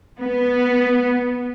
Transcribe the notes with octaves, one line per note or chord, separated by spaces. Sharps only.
B3